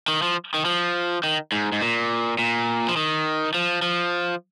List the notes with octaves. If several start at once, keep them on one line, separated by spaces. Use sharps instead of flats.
D#3
F3
D#3
F3
D#3
G#2
G#2
A#2
A#2
F3
D#3
F3
F3